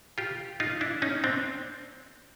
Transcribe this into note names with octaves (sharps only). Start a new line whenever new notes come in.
F4 G4
D#4 F4
D4 E4
C#4 D#4
C4 D4